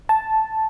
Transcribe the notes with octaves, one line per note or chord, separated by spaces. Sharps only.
A5